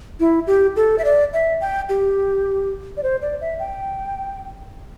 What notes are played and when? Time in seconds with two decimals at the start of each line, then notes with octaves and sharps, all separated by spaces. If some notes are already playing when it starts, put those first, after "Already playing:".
0.20 E4
0.47 G4
0.76 A4
0.98 E5
1.05 D5
1.33 E5
1.61 G5
1.89 G4
2.97 D5
3.03 C5
3.22 D5
3.41 E5
3.59 G5